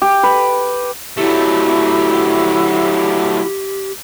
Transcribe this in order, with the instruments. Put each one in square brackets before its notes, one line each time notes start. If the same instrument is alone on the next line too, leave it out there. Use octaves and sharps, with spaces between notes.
[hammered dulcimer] G4
B4
[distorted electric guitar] F#3 A3 [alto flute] E4 [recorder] G4